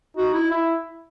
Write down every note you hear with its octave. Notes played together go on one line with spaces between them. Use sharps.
D#4 F#4
E4
E4